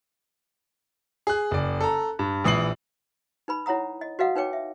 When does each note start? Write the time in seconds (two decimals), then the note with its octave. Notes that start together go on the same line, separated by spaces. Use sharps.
1.27 G#4 F#6
1.51 F#1 D5
1.81 A4 A#5
2.19 G2
2.44 A#1 E3 D#6 C7 F#7
3.48 D#4 B4 B5
3.66 E4 C#5 F#5 A#5 D#6
4.01 D#5
4.19 F#4 B4 D#5 F5 F#5 D#6
4.36 D#4 B4 C#5 G5 D6
4.53 E5